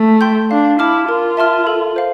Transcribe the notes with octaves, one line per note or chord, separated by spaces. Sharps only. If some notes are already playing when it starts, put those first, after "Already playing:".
Already playing: A3
G5 C6 G6
D4 F5
E4 A5 D6 F6
F4 A#4
E5 A5 C6 F6
A4
C5 F5